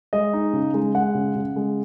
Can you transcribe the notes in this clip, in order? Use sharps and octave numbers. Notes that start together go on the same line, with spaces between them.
G#3 D#5
D#4
C#3
G#3
G#3 F#5
C#3
C#3
G#3